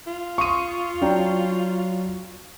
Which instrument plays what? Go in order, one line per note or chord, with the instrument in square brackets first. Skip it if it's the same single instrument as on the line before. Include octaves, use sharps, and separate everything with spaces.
[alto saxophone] F4
[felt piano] C6 D#6 D#7 [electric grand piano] C#6
[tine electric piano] F#3 [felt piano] D4 G5 A#5